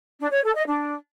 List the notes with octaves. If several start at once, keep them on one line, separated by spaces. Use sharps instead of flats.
D4
C#5
A4
D#5
D4